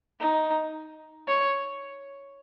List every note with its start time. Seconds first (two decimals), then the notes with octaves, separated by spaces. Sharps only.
0.20 D#4
1.28 C#5